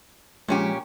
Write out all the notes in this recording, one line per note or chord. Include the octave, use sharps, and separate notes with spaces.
A#2 F3 G#3 C#4 G4